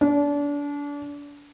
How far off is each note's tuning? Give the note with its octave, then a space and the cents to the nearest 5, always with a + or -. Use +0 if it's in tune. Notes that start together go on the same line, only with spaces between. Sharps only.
D4 -30